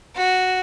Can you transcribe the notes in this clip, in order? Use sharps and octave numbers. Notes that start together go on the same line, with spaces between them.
F#4